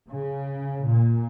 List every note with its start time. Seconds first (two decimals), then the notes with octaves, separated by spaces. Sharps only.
0.10 C#3
0.84 A#2